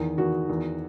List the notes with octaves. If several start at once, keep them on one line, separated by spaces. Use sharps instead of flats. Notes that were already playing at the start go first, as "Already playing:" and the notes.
Already playing: E2 D#3
E2 D#3 F#4
E2 D#3